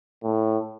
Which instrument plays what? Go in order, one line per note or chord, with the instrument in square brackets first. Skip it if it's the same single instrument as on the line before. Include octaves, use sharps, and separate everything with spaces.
[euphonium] A2